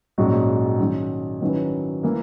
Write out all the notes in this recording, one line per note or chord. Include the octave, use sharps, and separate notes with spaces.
A#1 G#2 F#3 C#4 F#4
D#3 F#3 C#4
D#3 F#3 C#4 E4 B4
E3 A#3